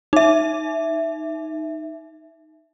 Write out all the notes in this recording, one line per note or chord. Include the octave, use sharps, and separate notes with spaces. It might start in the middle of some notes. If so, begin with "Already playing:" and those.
D#4 E5